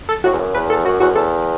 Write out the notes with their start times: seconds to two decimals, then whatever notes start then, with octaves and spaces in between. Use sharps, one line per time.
0.09 A4
0.24 A2 F#4
0.33 E2
0.39 F#2
0.54 E2 B4
0.70 A4
0.85 F#2 F#4
1.00 E2 F#4
1.09 F#2
1.15 E2 A4